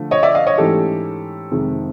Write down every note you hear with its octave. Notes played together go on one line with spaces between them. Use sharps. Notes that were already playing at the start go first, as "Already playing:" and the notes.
Already playing: D3 F3 A3
C#5 D#5
D5 E5
D#5 F5
C#5 D#5
G#2 E3 A3 C#4 G4 A4
F2 C3 D#3 G#3